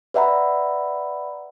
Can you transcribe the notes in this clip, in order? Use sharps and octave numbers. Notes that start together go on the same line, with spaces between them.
B4 D5 E5 F#5 A#5 B5